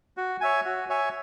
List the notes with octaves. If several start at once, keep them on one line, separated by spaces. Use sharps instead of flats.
F#4
C#5 E5 G#5
F#4
C#5 E5 G#5